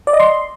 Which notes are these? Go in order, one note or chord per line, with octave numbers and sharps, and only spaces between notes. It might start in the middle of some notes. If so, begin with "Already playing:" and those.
D5
D#5
C6